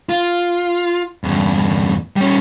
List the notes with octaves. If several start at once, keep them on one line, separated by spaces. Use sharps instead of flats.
F4
E2 G2
G3 C#4